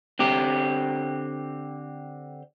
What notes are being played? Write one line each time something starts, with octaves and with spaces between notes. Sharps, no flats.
D3 C4 G4